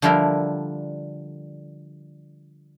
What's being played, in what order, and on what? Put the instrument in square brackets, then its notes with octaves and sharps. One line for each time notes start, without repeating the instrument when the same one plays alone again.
[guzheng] D3 F3 G3 E4 A#4